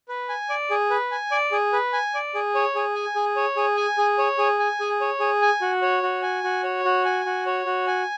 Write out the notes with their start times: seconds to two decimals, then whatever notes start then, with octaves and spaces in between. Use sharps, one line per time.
0.08 B4
0.29 G#5
0.49 D5
0.70 G#4
0.90 B4
1.11 G#5
1.31 D5
1.52 G#4
1.73 B4
1.93 G#5
2.14 D5
2.35 G#4
2.55 C#5
2.75 G#4
2.95 G#5
3.16 G#4
3.36 C#5
3.56 G#4
3.77 G#5
3.98 G#4
4.18 C#5
4.38 G#4
4.59 G#5
4.80 G#4
5.01 C#5
5.20 G#4
5.42 G#5
5.61 F#4
5.82 C#5
6.03 F#4
6.22 G#5
6.44 F#4
6.64 C#5
6.85 F#4
7.05 G#5
7.25 F#4
7.46 C#5
7.66 F#4
7.87 G#5